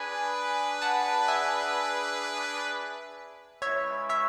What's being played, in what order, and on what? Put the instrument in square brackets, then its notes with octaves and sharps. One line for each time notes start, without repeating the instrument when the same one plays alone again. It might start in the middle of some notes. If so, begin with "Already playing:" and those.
Already playing: [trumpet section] D4 G#4 B4 [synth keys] G#5 B5
[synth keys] F#5 A5
E5 G#5
[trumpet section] G#3 C#4 E4 B4 [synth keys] C#5 E5
[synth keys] C#5 E5